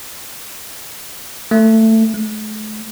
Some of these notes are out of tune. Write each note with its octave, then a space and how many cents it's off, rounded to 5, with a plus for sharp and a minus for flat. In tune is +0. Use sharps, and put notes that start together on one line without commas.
A3 +15
A3 -40